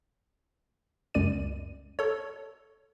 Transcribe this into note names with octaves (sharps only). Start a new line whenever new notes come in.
C#2 F#2 D5 D#7
A4 C#5